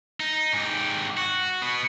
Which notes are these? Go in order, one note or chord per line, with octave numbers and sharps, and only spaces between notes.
D#4
G#2 G4
F#4
B2 B3